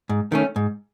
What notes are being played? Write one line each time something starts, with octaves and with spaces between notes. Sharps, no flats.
G#2
D#3 A3 C#4
G#2